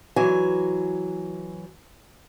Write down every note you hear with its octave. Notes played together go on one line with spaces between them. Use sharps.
E3 F#3 G#5